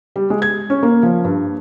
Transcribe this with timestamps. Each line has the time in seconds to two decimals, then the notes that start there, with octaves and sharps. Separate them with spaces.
0.16 G3
0.30 G#3
0.42 G#6
0.70 C#4
0.83 A#3
1.03 F3
1.24 G2